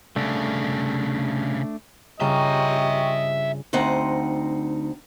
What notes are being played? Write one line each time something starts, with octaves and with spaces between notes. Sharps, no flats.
C2 C#3 A3 D4
G2 C#3 F4 D#5 E5 G5 A#5 C#6
D2 C4 D#4 F#5